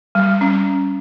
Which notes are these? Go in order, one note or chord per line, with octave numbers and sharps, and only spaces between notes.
G3
C#4